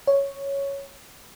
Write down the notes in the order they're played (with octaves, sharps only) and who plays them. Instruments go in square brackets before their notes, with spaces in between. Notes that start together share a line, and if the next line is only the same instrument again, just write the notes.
[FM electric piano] C#5